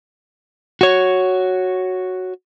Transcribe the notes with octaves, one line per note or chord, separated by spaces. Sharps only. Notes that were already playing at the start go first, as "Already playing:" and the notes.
F#4 C#5